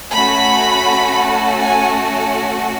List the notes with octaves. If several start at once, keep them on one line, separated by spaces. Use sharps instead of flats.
A3 C#4 F#4 B5
G#5